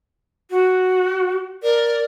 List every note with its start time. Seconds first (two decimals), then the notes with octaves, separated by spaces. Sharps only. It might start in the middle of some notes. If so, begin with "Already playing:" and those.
0.50 F#4
1.63 A#4 D5